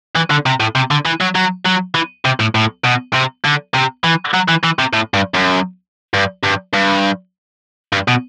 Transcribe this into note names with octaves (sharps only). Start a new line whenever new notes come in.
E3
D3
C3
A2
C3
D3
E3
F#3
F#3
F#3
E3
C3
A2
A2
B2
C3
D3
C3
E3
F#3
E3
E3
C3
A2
G2
F#2
G2
G2
G2
G2
B2